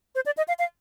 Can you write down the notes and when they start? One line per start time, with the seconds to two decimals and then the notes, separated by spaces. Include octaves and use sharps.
0.15 C5
0.26 D5
0.37 D#5
0.48 F5
0.59 F5